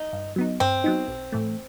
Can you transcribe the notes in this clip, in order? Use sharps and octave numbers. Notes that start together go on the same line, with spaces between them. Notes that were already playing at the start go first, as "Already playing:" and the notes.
Already playing: D#4
G2
F#3 B3 D#4
G2 C4
F#3 B3 D#4
B1
A2 E3 A3